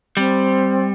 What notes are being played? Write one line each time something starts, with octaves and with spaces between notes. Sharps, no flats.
G3 C4